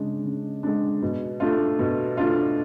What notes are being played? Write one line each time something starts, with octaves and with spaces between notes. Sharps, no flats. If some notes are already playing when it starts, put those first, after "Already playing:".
Already playing: C#3 G#3 D4
C#3
G#3 D4
B2
A3 D4 F4
B2
A3 D4 F4